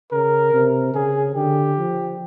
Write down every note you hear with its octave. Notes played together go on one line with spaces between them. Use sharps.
C#3 A#4
C3
C#3 G#4
D3 G4
F3